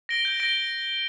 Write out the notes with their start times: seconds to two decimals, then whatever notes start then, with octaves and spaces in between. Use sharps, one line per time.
0.09 A#6 D7 G7
0.25 G6
0.40 A#6 D7 G7